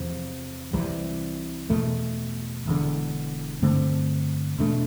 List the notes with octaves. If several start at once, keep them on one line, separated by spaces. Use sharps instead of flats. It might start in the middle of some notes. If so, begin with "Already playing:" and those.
Already playing: E2 C3 F3
C2 C3 E3 G3
E2 B2 A3
E1 E2 D3
G2 D3 A3 C4
E2 B2 A3 D4